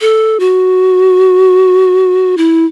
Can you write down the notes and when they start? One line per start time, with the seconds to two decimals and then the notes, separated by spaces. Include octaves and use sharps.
0.01 A4
0.40 F#4
2.37 E4